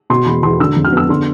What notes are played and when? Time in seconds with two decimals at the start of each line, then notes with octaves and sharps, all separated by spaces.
0.10 B2 C6
0.26 E2 B5
0.43 E2 C6
0.60 D3 E6
0.76 F2
0.85 F6
0.92 B3 E6
1.09 D3 C6